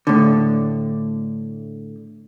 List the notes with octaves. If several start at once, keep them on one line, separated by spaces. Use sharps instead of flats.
A2 D3